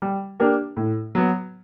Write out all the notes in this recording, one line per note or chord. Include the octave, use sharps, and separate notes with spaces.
G3
A#3 D4 G4 A#4
A2
F#3 B3